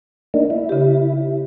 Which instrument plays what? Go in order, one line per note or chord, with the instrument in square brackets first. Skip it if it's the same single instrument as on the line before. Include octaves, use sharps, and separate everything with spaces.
[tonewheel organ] A#3 D4 D#4
E4
[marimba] C#3 G4